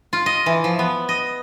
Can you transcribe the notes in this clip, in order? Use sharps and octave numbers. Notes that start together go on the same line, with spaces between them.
F4
D#5
E3
F3
B3
D#5